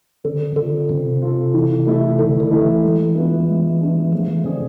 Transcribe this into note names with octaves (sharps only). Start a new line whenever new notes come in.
D3 C4
D3 F4 A4
C3 C4
F4 A4
E3
A3 E4 A4
D3 E3
D3
A3 E4 A4
E3
G#3
B3 D4 F4 G#4
G#3
B3 D4 F4 G#4
F3 A3
E3
C3 C4 G#4 D5